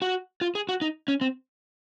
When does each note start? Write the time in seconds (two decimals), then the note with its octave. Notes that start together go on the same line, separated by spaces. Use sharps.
0.02 F#4
0.41 F4
0.55 G#4
0.69 F#4
0.81 D#4
1.08 C#4
1.21 C4